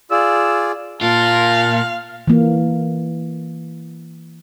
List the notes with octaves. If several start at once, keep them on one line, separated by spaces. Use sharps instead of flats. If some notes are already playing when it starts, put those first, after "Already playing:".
F4 G#4 D5 E6
A#2 F4 F5 A5 F#6
E3 A#3